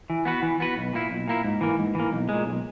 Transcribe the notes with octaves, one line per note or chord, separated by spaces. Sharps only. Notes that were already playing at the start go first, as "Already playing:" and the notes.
E3
B3 F#4 B4
E3
B3 F#4 B4
B1
A#2 A#3 E4
B1
A#2 A#3 E4
G#2
E3 A#3
G#2
E3 A#3
B1
A#2 G#3
B1